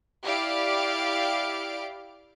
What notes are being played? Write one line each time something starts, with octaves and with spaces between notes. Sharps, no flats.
E4 G4 D5 F5 D7